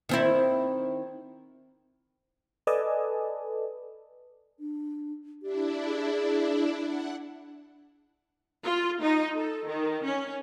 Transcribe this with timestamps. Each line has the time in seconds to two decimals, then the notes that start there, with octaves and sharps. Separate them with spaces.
0.09 D#3 C4 E4
2.67 A4 B4 D5 D#5 G#5 A5
4.60 D4
5.43 D4 E4 G4
5.86 G#4
6.85 D4 F#5
8.64 F4
9.01 D#4
9.35 A4
9.67 D#3
10.04 C#4